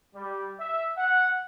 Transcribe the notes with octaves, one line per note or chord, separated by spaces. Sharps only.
G3
E5
F#5